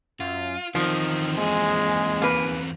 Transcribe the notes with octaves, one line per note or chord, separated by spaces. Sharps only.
F#2 F4
E2 D#3 F3 C4
D#2 G#3 G#4
A#3 B4